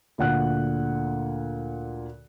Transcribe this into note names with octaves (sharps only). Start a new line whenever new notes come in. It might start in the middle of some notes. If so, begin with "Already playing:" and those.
D2 A#2 F#5 F#6